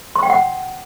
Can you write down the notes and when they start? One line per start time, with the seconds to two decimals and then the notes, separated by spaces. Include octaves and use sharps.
0.16 C6
0.23 G5
0.30 F#5